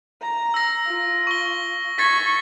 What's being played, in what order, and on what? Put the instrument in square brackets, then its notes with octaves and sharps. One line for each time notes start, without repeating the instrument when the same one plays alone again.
[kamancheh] A#5
[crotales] E6 A#6
[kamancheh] F4
[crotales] C#6 G7
[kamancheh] C#6 [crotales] G#6 A6 B6